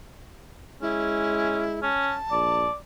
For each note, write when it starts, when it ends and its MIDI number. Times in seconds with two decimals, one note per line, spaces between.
0.82 1.91 56
0.82 1.63 61
0.82 1.83 64
1.83 2.15 61
1.83 2.70 81
2.31 2.67 34
2.31 2.75 74